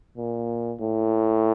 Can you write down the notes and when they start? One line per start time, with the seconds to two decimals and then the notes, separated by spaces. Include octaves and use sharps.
0.18 A#2
0.81 A2